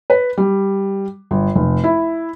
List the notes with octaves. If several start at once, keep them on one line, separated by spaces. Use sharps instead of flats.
B4
G3
G1
F1
E4